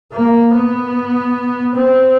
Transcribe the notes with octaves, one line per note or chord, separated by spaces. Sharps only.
A#3
B3
C4